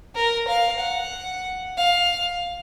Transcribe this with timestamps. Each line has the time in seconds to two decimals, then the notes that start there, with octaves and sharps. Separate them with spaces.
0.15 A#4
0.47 F5
0.79 F#5
1.77 F5